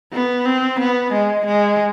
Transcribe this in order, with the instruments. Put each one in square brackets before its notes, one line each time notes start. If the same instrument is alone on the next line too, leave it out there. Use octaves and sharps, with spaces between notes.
[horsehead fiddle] B3
C4
B3
G#3
G#3